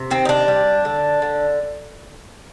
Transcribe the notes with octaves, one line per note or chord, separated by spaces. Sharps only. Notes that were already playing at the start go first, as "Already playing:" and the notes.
Already playing: C3
D#3 C4
D#4
D4
G3
D3
D3